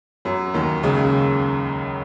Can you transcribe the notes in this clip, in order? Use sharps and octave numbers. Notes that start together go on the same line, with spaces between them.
F#2 F#3
D#2 D#3
C#2 C#3